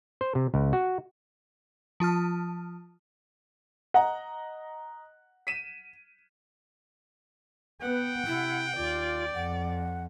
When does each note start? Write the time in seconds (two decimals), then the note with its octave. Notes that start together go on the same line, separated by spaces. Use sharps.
0.21 C5
0.35 C3
0.54 C#2
0.73 F#4
2.00 F3 F4 A5 F6
3.94 D#5 F#5 A#5
5.47 B6 D#7 E7
7.82 B3 B4 F#5 G5
8.27 C3 E4
8.76 D#2 F4 D5
9.34 F2 F#5